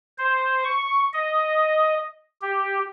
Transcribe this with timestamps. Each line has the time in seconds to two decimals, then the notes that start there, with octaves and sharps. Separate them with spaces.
0.18 C5
0.64 C#6
1.13 D#5
2.42 G4